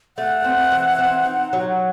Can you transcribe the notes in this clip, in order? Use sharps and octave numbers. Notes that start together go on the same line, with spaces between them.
A3 F#5
C4
E3
C4
D#4
F#3